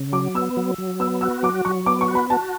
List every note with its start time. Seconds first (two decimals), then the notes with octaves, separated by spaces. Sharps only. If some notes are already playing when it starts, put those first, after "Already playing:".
Already playing: C#3
0.13 F#3 D6
0.35 B3 E6
0.57 F#3
0.78 F#3
1.00 B3 E6
1.21 F#4 E6
1.43 F#3 D6
1.65 F#3 C#6
1.86 B3 D6
2.01 C#6
2.08 F#4
2.15 B5
2.30 F#4 A5